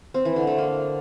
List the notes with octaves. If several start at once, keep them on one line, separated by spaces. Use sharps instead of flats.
C4
E3
D3
A3
A#3